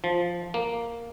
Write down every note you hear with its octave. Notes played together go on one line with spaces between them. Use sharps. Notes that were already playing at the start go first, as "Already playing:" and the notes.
F3
A#3